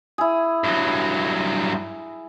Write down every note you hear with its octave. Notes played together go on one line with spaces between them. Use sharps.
E4 G#4
G2 F#3